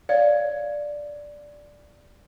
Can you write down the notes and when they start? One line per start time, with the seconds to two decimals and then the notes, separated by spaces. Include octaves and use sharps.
0.09 C#5 D5 F5